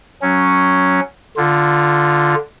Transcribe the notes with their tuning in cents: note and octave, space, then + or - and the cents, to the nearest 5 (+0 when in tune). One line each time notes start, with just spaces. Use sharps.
F#3 +0 C#4 +0
D3 +0 F4 +0